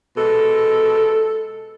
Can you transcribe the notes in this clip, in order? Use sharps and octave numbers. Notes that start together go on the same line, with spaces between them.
B2 G#3 A4